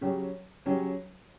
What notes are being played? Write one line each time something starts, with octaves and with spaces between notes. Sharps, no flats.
C#3 F#3 C#4 G4 C#5
C#3 F#3 C#4 G4 C#5